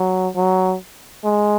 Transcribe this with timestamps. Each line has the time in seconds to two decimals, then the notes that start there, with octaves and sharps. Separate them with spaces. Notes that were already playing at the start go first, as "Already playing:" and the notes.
Already playing: F#3
0.36 F#3
1.24 G#3